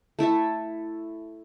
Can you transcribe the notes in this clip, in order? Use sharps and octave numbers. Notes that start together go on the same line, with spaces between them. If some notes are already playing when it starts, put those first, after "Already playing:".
A3 E4 A4 E5